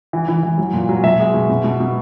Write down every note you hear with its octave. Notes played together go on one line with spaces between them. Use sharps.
E3
E3
E3
F#3
A#2
F#3
B2 E5
G#3
B2
B2
B2
B2